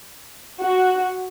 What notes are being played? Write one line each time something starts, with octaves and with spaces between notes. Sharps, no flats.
F#4